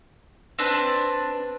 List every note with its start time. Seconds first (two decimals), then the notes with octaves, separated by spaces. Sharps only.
0.59 C4 D4 B4